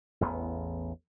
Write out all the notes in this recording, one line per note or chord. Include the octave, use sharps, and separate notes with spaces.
A1 E2 B3